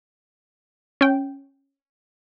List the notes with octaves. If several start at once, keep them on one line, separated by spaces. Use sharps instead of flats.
C#4 G5